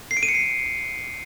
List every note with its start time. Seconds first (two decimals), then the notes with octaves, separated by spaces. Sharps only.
0.11 C7
0.17 D7
0.23 D#7
0.29 C#7
0.34 C7